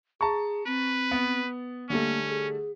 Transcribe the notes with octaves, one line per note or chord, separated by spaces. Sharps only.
G#4 A5 A#5 C#6
C4 B4
B3
D3 G3 A3 A#3 C#4
G#4